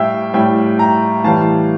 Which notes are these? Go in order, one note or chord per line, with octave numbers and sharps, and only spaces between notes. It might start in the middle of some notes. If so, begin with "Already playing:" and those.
Already playing: A2 G3 E5 F5 G5
A2 G3 E5 G5
G5 A#5
A2 E3 G3 F5 A5